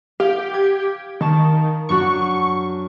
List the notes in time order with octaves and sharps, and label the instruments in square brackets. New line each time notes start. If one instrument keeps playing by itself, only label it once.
[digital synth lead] G4 [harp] F5 G#6
[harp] G#6
[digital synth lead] D#3 [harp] A5 C#6
[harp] F#2 D4 F#4 [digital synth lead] C#6